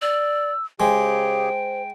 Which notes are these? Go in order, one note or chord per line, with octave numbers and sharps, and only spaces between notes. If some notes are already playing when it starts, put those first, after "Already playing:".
D5 E6
C#3 G#3 G4 G#4 C5 G5